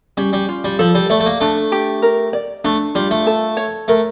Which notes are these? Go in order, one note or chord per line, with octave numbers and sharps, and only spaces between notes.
G3 C#4
G3
F4
G3
F3 A4
G3
A3 D5
A3
A#3
A3 D4
G4
A#4
D5
A3 D4
G3 F4
A3
A4
C#5
A3 A#4